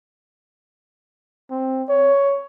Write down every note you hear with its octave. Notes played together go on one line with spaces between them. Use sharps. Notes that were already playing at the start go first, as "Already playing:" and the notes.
C4
C#5